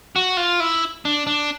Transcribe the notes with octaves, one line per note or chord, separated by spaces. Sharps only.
F#4
F4
E4
D4
D4